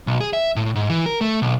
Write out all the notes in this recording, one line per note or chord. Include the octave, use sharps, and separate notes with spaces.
B1
G#4
E5
A2
G#2
E3
A#4
A3
B1